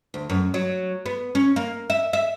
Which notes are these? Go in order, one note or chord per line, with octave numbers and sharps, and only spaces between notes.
D2
F#2
F#3
B3
C#4
A#3
E5
E5